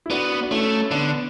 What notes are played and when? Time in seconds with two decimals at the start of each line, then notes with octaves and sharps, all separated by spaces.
0.06 E4
0.10 B3 D4 F#4
0.43 D4
0.51 A3 C#4 E4
0.91 D3 B3 D4
1.08 D4